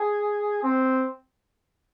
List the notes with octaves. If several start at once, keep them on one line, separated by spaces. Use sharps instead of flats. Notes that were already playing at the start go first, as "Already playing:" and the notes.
Already playing: G#4
C4